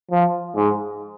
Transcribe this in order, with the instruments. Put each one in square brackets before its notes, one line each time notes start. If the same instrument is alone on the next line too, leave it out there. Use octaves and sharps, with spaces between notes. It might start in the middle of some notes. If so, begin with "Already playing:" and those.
[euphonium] F3
G#2